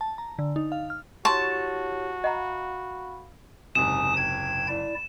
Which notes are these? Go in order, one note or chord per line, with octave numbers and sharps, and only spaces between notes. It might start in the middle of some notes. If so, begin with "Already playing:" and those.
A5
A#5
D3
D#4
F5
F6
E4 F#4 G4 C#5 A5 C6 C#6
D#5 F5 F#5 A#5 B5
F#1 G#2 C3 G#5 D#6 E7
G5 G#6
E4 D5